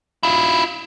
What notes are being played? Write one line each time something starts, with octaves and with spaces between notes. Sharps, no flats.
E4 F4